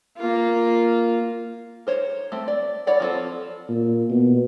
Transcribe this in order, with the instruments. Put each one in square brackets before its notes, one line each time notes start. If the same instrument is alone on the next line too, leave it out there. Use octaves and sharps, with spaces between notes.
[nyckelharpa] A#3 F4
[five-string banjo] A#4 C5 C#5
A3 C4
D5
E4 C#5 D5 F#5
F3 C4 A4
[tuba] A#2
B2